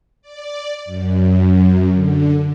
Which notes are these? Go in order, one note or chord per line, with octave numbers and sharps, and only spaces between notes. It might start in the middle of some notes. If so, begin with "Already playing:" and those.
D5
F#2
D3